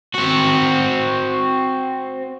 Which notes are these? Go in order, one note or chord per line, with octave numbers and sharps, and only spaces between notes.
C4 F#4